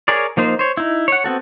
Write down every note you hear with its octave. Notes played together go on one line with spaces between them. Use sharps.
G#4 A#4 C#5 D5
F3 A#3 D#4 C5
C5 C#5
D#4 E4
C#5 F#5
B3 C4 F#4 A4